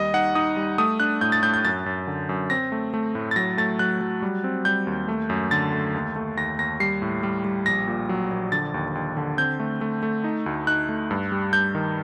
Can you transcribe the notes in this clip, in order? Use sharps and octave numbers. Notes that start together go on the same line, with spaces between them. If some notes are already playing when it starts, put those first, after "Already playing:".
Already playing: D#2 G3 D#5
D#4 F#5
D#4 D#6
G3
A3 D#6
D4 F#6
A2 G6
A6
A2 G6
G6
F#2 A6
F#2
D3
F#2
C4 A#6
A3
A3
A2
A6
F#3 A#6
A3 A6
F#3 F#6
F#3
G3
C4
G3 G6
D#2
A3
F#2
D3 A6
A3
D#2
A3
D#2 A#6
D#2 A#6
G3 C7
A2
G3
G3
A#1 A#6
A#2
F#3
A#1
D3 A6
D#2
D#2
D3
C4 G6
A3
A3
A3
D#4
D2
D#4 F#6
A3
G2
G3
G2 G6
D#3